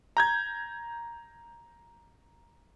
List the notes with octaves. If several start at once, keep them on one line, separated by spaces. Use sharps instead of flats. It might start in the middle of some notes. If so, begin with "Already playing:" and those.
A#5 G6 G#6